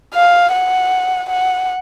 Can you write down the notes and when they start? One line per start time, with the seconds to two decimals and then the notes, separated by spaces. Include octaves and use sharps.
0.15 F5
0.53 F#5
1.29 F#5